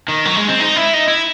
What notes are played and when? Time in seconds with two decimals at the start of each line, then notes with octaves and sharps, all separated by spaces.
0.09 D#3
0.26 F#3
0.36 G#3
0.49 C4
0.60 D#4
0.76 E4
0.94 D#4
1.08 E4